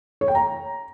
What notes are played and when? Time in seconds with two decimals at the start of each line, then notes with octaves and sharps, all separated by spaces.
0.21 C#5
0.28 G5
0.35 A#5